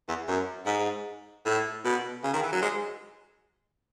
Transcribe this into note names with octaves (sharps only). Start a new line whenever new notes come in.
E2
F#2
G#2
A2
B2
C#3
D#3
E3
F#3
G#3